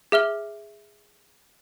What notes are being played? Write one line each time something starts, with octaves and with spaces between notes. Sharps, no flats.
G#4 E5 F6 G7